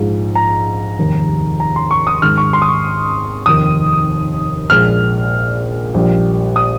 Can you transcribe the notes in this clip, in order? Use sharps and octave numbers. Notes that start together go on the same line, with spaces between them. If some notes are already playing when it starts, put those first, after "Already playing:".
Already playing: A#1 G#2 F3 G#3
A#5
F1 D#2 D#3 G3
A#5
C6
C#6
D#6
G#1 G#2 D#3 G#3 F6
C#6
C6
D#6
C#6
F1 D#2 D#3 D#6
A#1 A#2 G#3 F6
A#1 A#2 G3
D#6